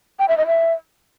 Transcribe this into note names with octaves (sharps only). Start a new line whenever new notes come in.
G5
E5
D#5
E5